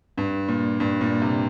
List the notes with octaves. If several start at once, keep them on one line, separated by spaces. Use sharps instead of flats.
G2
A#2
G2
A#2
C3